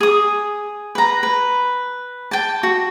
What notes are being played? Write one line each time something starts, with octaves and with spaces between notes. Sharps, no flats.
G#4 D#6
B4 A#5
B4
G5 A5
F#4